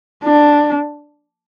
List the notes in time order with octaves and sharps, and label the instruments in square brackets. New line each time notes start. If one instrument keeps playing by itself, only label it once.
[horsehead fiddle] D4